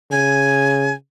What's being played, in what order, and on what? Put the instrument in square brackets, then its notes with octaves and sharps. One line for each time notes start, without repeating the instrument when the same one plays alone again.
[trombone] C#3 [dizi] G#5